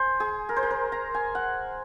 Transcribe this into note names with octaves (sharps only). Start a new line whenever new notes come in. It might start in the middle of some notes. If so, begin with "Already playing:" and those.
Already playing: C5 G#5
G#4
A#4
C5
A#4
C5
A#5
G#5
F#5